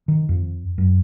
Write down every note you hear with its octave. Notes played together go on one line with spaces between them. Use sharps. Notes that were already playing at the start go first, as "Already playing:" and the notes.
D#3
F2
F#2